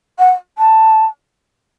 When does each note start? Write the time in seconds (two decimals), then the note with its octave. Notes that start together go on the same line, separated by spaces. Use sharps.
0.19 F#5
0.58 A5